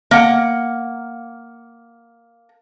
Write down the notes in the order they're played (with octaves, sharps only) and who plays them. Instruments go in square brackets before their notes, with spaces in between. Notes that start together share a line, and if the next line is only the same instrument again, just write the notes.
[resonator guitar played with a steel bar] A#3 F#5